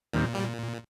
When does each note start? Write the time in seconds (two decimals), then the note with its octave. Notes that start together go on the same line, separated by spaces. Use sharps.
0.13 D#2 A#2 D#3 G3 C4
0.34 G3